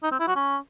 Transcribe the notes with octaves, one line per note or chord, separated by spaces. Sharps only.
D#4
C4
E4
F#4
C#4